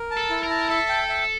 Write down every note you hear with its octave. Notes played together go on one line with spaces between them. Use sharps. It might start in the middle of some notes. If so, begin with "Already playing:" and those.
Already playing: A#4
A5
A4
E4
A#4
A5
A4 E5
G5
E5